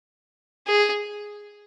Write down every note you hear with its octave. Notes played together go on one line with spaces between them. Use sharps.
G#4